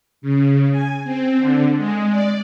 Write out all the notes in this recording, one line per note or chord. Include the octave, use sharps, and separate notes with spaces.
C#3
G#5
C4
D3
G#3
D5